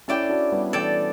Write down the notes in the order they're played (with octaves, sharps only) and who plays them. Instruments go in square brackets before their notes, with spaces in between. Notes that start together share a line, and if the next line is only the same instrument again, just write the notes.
[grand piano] C#4 E4 [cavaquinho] A4 D5 G5
[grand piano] D4 F#4
G3 B3
[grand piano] E3 G3 [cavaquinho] A4 D5 G5